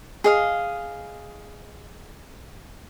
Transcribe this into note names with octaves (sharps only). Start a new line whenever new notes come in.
G#4 D#5 F5